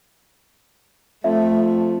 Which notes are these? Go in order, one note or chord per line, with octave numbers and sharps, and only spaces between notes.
F2 A3 E5